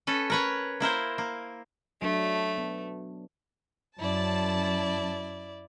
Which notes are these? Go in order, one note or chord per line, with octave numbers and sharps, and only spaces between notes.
C#4 A4 B4
A#4 B4 C#5
A#3 E4 A#4 C5
A#3
F#3 A3 D4
B3
F#2 E4 D5 A5